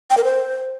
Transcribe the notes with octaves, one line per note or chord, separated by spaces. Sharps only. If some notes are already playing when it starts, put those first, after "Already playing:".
G5
A#4
C5